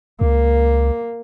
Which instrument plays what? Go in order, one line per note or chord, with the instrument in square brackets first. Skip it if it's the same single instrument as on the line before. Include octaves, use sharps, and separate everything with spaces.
[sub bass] C#2 [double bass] A#3